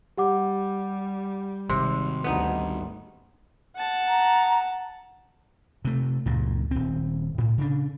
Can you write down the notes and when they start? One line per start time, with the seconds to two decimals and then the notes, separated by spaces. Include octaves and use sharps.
0.17 G3 G4 F#5 D6
1.70 G#1 C3 C6
2.24 D2 G3 B3 D#4
3.76 F#5 A5
4.08 A#5
5.85 C3 A3
6.26 C#2 G2 A#2
6.71 D#1 C4
7.38 A2
7.58 C#3 D4